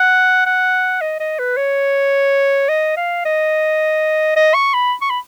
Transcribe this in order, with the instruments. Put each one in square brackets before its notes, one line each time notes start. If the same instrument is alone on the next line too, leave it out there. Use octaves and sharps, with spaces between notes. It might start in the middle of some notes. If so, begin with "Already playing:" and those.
Already playing: [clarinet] F#5
F#5
D#5
D#5
B4
C#5
D#5
F5
D#5
D#5
C#6
B5
C#6
B5